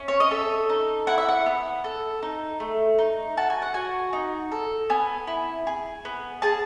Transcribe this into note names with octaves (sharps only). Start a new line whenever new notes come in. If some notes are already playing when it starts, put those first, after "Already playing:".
Already playing: C#4
C#5
D#5
A4 E5
D#4
E4 F#5
E5
F#5
B3
A4
D#4
A3
D#4
F#4 A5
G#5
F#5
F#4 G#5
D#4
A4
B3 G#5
E4
G#4
B3
G#4 A5